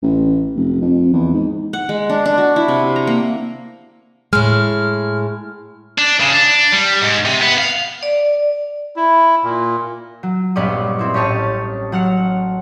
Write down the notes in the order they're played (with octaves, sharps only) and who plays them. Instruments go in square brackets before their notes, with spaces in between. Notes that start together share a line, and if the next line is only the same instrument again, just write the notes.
[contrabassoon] A1
F1
F2
E2
G#2
[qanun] F#5
G#3
D4
D4
F#4
E4
C3
A#5
A#3
[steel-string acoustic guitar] A2 G#3 [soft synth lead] F6
[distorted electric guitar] D4
C#3
D4
G3
G#2
C3
B3
F5
[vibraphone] D5
[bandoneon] E4
A#2
[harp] F#3
A#1 G2 B3 C#4 D5 D#5
C4 E4
A1 C#4 G4 C#5 A5 D#6
F#3 F#5 F6 C#7